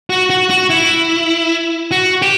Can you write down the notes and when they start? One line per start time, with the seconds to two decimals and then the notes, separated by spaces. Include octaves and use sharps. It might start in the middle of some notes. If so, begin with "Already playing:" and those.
0.10 F#4
0.30 F#4
0.50 F#4
0.70 E4
1.91 F#4
2.22 G4